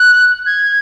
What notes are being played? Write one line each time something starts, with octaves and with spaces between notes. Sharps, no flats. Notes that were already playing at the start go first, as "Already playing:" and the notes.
Already playing: F#6
G#6